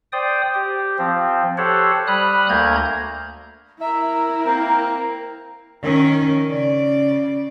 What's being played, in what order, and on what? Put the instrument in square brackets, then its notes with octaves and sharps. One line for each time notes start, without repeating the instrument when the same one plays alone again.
[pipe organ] C5 D5 G5 D#6
G4
F3 C4
G4 A4 C5 C#5 F#5
G3 B5 D#6 F6 F#6
D2 A#3 A#5 G6 G#6
[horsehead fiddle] E4 A#4 [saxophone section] E5 [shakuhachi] A#5
[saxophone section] A#3 C4
[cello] D#3 C#4
C#3 D5